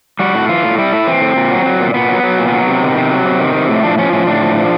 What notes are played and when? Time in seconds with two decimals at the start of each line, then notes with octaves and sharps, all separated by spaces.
0.19 G3 F#4
0.35 A2
0.49 E3 F4
0.63 A2
0.78 G3 E4
0.93 A2
1.07 E3 C4
1.22 A2
1.36 A#2
1.51 F#3
1.66 F#3
1.80 A#2
1.94 A#2 B3
2.09 F#3
2.23 F#3
2.38 A#2
2.53 F#3
2.68 C3
2.82 D#3
2.97 C3
3.11 F#3
3.25 C3
3.40 D#3
3.55 C3
3.69 A2 A3
3.83 F3 D4
3.98 F3 C#4
4.13 A2 C#4
4.27 A2 D4
4.42 F3
4.56 F3